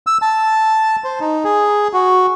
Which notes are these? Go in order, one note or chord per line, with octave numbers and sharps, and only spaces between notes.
E6
A5
C5
D#4
G#4
F#4